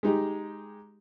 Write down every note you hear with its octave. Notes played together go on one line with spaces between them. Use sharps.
G#3 D#4 G4